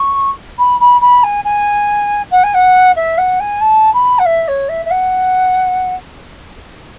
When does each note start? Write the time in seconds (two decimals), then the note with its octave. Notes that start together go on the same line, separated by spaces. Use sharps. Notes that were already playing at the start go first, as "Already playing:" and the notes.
Already playing: C#6
0.59 B5
0.80 B5
1.01 B5
1.24 G#5
1.45 G#5
2.31 F#5
2.44 G#5
2.54 F#5
2.96 E5
3.18 F#5
3.40 G#5
3.61 A5
3.94 B5
4.19 F#5
4.26 E5
4.48 C#5
4.69 E5
4.86 E5
4.91 F#5